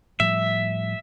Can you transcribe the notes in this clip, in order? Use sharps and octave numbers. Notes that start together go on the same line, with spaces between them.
A2 F3 G3 E5